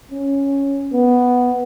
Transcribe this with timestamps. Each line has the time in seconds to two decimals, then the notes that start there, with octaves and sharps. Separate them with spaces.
0.11 C#4
0.94 B3